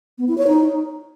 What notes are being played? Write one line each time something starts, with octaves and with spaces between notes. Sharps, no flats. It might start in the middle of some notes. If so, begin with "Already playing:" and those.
B3
E4
C#5
D#4